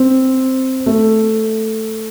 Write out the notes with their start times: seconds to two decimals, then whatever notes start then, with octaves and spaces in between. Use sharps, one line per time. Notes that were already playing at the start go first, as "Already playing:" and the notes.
Already playing: C4
0.86 A3